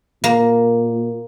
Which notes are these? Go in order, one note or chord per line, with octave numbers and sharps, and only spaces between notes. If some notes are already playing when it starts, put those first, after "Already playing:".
A#2 A#3